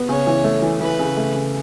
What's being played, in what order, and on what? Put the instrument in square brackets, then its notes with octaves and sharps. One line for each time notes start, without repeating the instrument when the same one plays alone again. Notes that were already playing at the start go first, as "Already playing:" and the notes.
Already playing: [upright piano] B3
[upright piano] C#3 [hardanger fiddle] C#5
[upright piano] E3
A3
E3
[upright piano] E3 [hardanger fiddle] B4
[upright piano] C#3
A3
C#3